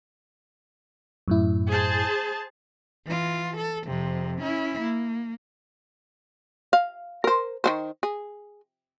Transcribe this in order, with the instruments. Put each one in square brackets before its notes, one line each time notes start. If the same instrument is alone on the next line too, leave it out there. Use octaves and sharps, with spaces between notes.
[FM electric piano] F#2 A2 E4
[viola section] G#4 C5 A5
[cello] E3 F4
A4
F2 C3
C#4 E4
A#3
[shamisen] F5
A#4 C5
D#3 B3 C5
G#4